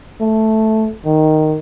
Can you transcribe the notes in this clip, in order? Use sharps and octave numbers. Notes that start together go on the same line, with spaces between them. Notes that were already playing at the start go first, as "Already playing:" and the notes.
A3
D#3